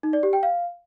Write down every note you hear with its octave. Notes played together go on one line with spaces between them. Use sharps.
D#4
D5
G4
G5
F5